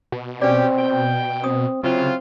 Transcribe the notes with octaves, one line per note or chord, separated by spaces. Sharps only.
B2
C4 C#4 G4 D5
G5
C4 D#6
C#3 F#3 C4 E4 F4